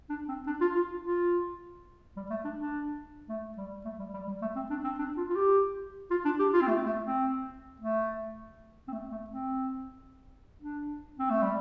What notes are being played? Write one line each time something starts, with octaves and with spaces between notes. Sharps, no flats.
D4
C4
D4
F4
F4
F4
G3
A3
D4
D4
A3
G3
A3
G3
G3
G3
A3
C4
D4
C4
D4
F4
F4
G4
F4
D4
G4
F4
C4
A3
A3
C4
A3
C4
A3
A3
C4
D4
C4
A3
G3